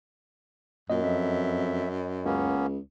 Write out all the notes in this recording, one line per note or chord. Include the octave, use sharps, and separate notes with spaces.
F#2 A#2 D#5
F2 E5
C#2 A#3 B3 C#4